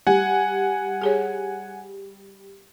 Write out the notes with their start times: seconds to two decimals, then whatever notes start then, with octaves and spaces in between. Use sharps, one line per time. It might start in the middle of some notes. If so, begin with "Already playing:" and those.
0.07 G3 F#5 G#5
1.01 G4 G#4 C#5